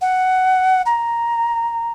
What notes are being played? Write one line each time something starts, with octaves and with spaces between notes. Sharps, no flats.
F#5
A#5